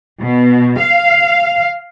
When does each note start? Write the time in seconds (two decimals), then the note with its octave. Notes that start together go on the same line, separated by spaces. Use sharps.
0.22 B2
0.79 F5